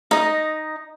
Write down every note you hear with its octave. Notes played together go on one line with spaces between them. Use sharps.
D#4 D#5